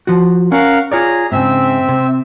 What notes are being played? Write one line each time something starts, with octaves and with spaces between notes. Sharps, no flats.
F3 F#4
C#4 A#4 F5 F#5
F4 G#4 C#5 D5 A#5
G#2 C#3 C4 E5
C3